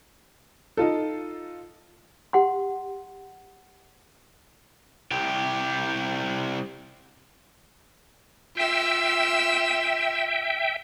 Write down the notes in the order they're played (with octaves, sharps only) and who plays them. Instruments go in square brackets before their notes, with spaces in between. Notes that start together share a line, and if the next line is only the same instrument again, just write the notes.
[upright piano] D#4 F4 A4
[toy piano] G4 F#5 C6
[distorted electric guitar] C2 G4
[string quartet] F4 E6 [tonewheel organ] E5 G5